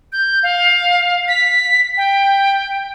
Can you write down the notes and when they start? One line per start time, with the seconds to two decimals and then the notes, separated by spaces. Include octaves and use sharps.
0.12 G6
0.43 F5
1.28 B6
1.97 G5